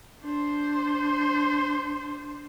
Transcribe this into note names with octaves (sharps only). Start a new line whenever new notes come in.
D4 C5